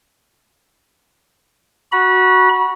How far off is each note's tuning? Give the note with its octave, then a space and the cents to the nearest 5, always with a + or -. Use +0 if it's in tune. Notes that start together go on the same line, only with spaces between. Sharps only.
F#4 +0 B5 -35